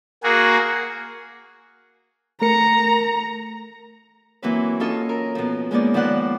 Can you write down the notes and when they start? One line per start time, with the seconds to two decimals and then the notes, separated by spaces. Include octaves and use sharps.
0.23 A#3 F#4 G#4
2.42 A3 A#4 A#5 C#7
4.42 E3 F#3 A#3 C4 B4
4.80 C#4 F4 A4 D#5
5.09 A#4
5.35 B2 F3
5.71 G#3 A#3 B3 C#4 D#4 D5
5.94 D#3 F3 B4 D5 F#5 F#6